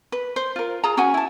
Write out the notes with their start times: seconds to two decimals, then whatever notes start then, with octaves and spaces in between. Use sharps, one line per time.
0.12 B4
0.36 C5
0.56 F4 A#4
0.84 F4 G#4 A#5
0.97 C#4 F#4 F#5 G#5
1.14 E4 A5